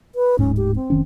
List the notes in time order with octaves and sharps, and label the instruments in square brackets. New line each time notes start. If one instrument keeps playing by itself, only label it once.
[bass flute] B4
[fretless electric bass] D1 G#2 [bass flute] C#4
[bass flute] G4
C4
[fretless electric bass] F1 D#3 C#4